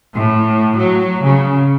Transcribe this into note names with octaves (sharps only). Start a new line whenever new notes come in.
A2
F#3
C#3